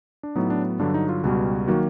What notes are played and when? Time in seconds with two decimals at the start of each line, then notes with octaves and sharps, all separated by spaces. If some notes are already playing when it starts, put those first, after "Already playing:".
0.23 D4
0.36 A2 F#3 B3 D#4
0.50 D4
0.79 G2 D3 F#3 D4
0.94 D#4
1.09 F4
1.24 C#2 B2 G3 F#4
1.68 D#3 F#3 A#3 F#4